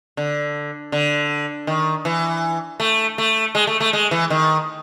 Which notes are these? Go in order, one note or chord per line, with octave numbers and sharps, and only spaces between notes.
D3
D3
D#3
E3
A3
A3
G#3
A3
A3
G#3
E3
D#3